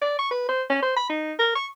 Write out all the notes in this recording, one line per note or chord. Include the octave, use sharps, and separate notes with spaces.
D5
C#6
B4
C5
C#4
C5
B5
D#4
A#4
C#6